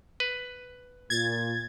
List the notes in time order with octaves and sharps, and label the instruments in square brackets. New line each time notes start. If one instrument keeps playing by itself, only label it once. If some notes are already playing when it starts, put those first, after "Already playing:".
[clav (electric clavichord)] B4
[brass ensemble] A#2 [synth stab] G#6 A6